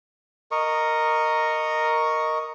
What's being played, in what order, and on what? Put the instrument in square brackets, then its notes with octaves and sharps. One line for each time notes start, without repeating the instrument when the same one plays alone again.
[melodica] A#4 D#5 C#6